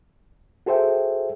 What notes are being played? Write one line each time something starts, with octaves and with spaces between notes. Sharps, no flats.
F#4 G#4 A4 C5 E5 G5